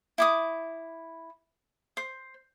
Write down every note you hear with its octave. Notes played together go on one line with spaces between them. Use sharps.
E4 D6 D#6
C5